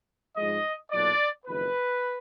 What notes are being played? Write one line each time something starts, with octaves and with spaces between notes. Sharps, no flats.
G#2 F3 G#3 D#5
B1 A#2 F#3 D4 D5
F#1 F2 D#3 B4